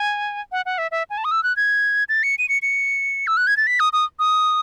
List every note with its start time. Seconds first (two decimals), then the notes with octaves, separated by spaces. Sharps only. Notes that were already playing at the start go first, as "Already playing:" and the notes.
Already playing: G#5
0.52 F#5
0.66 F#5
0.78 E5
0.91 E5
1.10 G#5
1.18 A5
1.25 D#6
1.31 E6
1.43 F#6
1.56 G#6
2.09 A6
2.23 C#7
2.38 D#7
2.49 C#7
2.62 C#7
3.27 E6
3.37 F#6
3.47 G#6
3.57 A6
3.67 B6
3.80 D#6
3.93 D#6
4.19 D#6